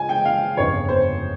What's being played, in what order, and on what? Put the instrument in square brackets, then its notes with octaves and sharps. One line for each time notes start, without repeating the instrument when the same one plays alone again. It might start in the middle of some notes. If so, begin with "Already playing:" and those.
Already playing: [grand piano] C#3 G#3 C#4 F4 [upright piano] G#5
[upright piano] G5
F5
[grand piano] G1 F2 C#3 [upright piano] C#5
[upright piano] C5